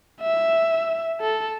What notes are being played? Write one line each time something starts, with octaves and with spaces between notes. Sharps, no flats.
E5
A4